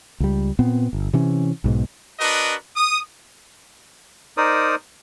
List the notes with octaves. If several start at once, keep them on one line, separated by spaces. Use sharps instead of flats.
C#2 G3
A#2 B3 C4
G1
C3 E3 C#4
B1 G#2 B2
D4 F#4 A#4 B4 D#5
D#6
D#4 A#4 C5 D5 D#6